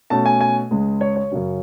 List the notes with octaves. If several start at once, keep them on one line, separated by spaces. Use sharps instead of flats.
B2 A3 C#4 A5
G#5
G#5
C#2 C#3 G#3
C#5
C#5
F#2 C#3 F#3 C#4